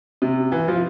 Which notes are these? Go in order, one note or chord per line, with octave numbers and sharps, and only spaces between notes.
C3
E3
F3